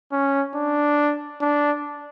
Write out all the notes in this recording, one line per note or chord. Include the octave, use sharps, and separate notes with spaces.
C#4
D4
D4